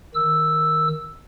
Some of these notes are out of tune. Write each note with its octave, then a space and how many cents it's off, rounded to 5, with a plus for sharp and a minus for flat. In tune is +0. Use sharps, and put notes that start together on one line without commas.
D#3 +0 E6 +0